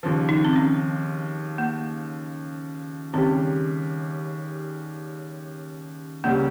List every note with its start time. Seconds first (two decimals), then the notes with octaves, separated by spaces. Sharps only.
0.03 D#2 C#3 F3
0.29 D#4
0.45 C4
0.56 C#4
1.58 A#3
3.13 D#2 C#3 G3 C4 C#4 G4
6.24 C#2 C#3 G3 A#3 C#4